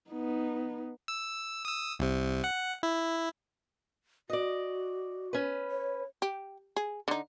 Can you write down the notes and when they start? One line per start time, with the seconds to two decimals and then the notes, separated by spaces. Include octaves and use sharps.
0.10 B3 D#4
1.08 E6
1.65 D#6 E6
1.99 C2 C3
2.44 F#5
2.83 E4
4.30 F#4 D5 D#5
5.33 C#4 B4
5.71 C#5
6.22 G4
6.76 G#4
7.08 D3 D#4